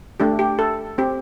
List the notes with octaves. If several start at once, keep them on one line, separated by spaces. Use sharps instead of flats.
A3 D4 G4
G4
A4
C4 G4